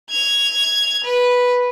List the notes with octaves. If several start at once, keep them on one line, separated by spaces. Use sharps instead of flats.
G#6 F7
B4